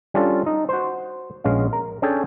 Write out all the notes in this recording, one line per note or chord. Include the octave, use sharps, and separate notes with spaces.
G3 C#4 D4 F4 A4
D#4
F#4 C5
A#1 G#3 B3 C#4 F5
A#4
C#4 D4 G#4 A4 C#5 G5